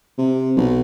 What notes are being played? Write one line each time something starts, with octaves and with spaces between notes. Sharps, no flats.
C3
B1